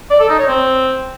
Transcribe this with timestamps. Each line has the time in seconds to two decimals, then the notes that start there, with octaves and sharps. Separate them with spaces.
0.10 D5
0.20 A4
0.29 D#4
0.39 C#5
0.48 C4